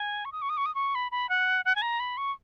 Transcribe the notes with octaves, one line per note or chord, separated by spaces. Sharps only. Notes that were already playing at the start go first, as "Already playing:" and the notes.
Already playing: G#5
C#6
D#6
C#6
D#6
C#6
D#6
C#6
B5
B5
F#5
F#5
G#5
A#5
B5
C#6